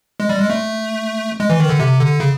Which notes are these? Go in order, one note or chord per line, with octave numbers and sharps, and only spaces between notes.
G#3
G3
G#3
A3
G#3
E3
D#3
D3
C3
D3
C#3